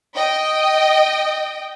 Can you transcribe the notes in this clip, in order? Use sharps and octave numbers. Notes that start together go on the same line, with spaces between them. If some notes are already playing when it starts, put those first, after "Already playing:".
D#5 G5